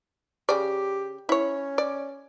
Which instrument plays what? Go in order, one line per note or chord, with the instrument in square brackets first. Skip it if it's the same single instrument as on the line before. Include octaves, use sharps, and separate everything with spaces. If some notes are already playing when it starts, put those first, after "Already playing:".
[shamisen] C#3 G#4 D5 [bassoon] G4
[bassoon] C#4 [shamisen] E4 C#5
[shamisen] D5